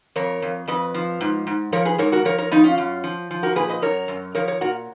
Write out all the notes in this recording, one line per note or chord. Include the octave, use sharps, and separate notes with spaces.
F2 A#4 C#5
F2
F2 B4 D#5
F3
G#2
G#2
F3 A#4 C#5
G#4 B4
G#2 A#4 C#5
F#4 A#4
F3 A#4 C#5
A#4 C#5
F3 B3 D#4
C#4 F4
F#2
F3
F3
F#4 A#4
A#2 G#4 B4
B4 D#5
F#2 A#4 C#5
F#2
F3 A#4 C#5
A#4 C#5
A#2 F#4 A#4